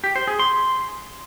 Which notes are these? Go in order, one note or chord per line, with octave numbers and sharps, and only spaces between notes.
G4
C5
G#4
C6